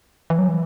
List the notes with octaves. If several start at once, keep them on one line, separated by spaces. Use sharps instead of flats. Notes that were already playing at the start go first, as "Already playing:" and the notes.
E3
F#3
E3